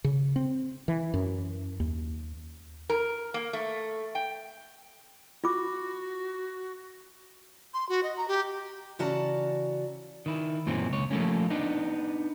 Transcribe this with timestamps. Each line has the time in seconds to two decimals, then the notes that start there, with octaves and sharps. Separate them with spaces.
0.04 C#3
0.36 C4
0.88 E3
1.14 F#2
1.80 D#2
2.90 A#4
3.34 A#3
3.53 A3
4.15 G5
5.44 F4 F#4 D6
7.74 C6
7.89 F#4
8.03 D#5
8.17 A#5
8.28 G4
8.99 C#3 E3 F#4 D5 A5 A#5
10.26 D#3 E4
10.67 F#2 A#2 E3 C4 C#4
10.90 C#2 C#5
11.11 F3 A3 A#3 C#4
11.50 B3 D4 D#4